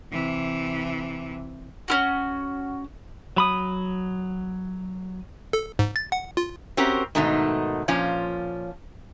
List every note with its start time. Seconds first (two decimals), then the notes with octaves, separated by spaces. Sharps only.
0.12 C3 E3
1.88 C#4 F4 F#4
3.36 F#3 B5 D#6
5.53 A4
5.79 G#2
5.96 A6
6.12 F#5
6.37 F4
6.77 C4 C#4 F#4 G4 A#4
7.15 G#2 B2 D#3 A3 D#4
7.88 A#2 F3 C#4 F4